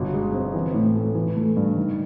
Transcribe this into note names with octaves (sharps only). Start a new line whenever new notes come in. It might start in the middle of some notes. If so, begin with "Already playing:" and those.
Already playing: G1 B2
G#3
C4
E3
A2
A3
E3
A3
G2
D#3